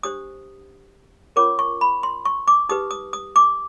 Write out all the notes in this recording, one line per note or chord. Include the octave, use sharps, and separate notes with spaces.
D4 G4 C5 D#6
C#4 F4 A#4 C#5 D6
C#6
B5
C6
C#6
D6
D#4 G4 B4 D#6
D#6
D#6
D6